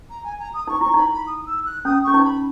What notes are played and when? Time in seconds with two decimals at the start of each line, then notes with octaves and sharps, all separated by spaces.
0.10 A#5
0.23 G#5
0.39 A#5
0.53 D#6
0.67 D#4 C#6
0.81 E4 C#6
0.94 D#4 B5
1.12 B5
1.26 D#6
1.46 E6
1.65 F#6
1.84 C#4 D#6
2.04 C#4 C#6
2.14 D#4
2.24 B5